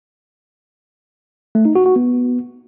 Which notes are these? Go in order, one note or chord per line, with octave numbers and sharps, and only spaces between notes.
A3
D#4
F#4
F#4
B3